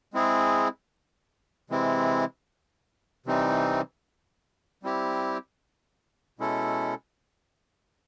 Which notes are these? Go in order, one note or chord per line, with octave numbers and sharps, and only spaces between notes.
G#3 C4 E4 G#4
C3 E3 G#3 C4 E4
C3 E3 G3 C4 D#4
G3 C4 E4 G4
B2 G#3 C#4 E4 A4